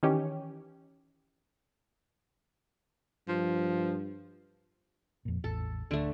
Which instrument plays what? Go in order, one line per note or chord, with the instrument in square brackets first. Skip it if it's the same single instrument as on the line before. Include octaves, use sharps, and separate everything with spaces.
[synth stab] D#3 E3 C#4 G4
[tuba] G2 [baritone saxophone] F3
[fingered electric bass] F2 A#2
[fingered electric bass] A1 E2 [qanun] A4
[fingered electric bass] D1 [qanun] D3 A3